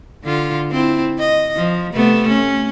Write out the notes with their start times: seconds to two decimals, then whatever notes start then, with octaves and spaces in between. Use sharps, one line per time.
0.24 D3 F4
0.71 C4 E4
1.19 D#5
1.56 F3
1.93 C3 A3 B3
2.28 C#4